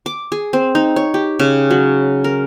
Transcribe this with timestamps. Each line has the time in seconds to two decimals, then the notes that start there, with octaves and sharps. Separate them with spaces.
0.06 D6
0.32 G#4
0.53 C4
0.75 D#4
0.96 C#5
1.14 G4
1.39 C#3
1.70 F#3
2.24 A#4